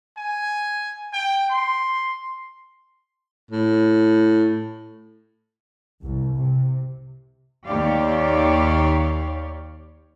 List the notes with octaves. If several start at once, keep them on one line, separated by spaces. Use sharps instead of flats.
G#5
G5
C6
A2
C2
C3
D#2 G4 C#5 D5 F5